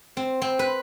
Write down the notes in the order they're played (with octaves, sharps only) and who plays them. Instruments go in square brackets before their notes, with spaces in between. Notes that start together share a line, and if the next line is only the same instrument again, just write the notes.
[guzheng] C4
C4
B4